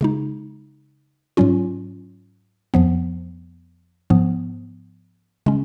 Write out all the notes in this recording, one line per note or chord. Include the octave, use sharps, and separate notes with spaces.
C#3 G#3 D#4
G#2 F#3 C#4 F4
F2 F3 B3
G#2 F3 B3
C#3 G#3 C#4